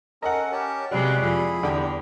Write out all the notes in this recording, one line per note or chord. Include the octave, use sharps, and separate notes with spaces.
C#4 A4 A#4 D#5 F#5
C#4 G4 A#4 A5
C3 G3 G#3 C4 C#4 F#4 B4
F2 E4 G#4 B5
E2 D3 G3 G5